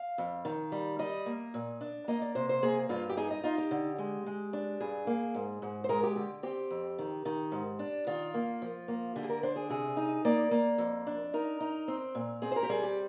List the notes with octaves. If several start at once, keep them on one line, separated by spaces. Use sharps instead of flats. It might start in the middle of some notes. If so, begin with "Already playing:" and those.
Already playing: F5
F2
D#3
G3
G3 D#5
A#3
A#2
D4
A#3 D#5
D5
C3 C5
C5
A#3 G#4
G2 F4
G4
D#4 G#4
D#5
D#4 F4
G4
D3
G#3
G#3
D4
G2 G#4
A#3
G#2
G#2
C5
G#3 A#4
G4
D3 G4
C4 G4
F2
D#3
D#3
G#2
D4
D#3 F4
A#3
F3
A#3
D3 G4
G#4
A#4
D4 C5
G#4
C3 G#4
D#4
A#3 D5
A#3
F2
D4
D#4 A#4
D#4
C4
A#2
C4 G#4
C5
A#4
G4
G3 G#4
G4